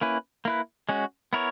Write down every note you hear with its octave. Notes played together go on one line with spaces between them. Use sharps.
A#3 C#4 E4 B4
A#3 E4 B4
G#3 C#4 F#4
B3 E4 A#4 C#5